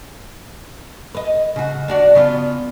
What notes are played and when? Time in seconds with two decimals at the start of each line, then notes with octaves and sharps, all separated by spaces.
1.15 B4 D#5
1.56 C#3 F#4
1.88 D4 F#4 D5
2.15 C#3 B3 F4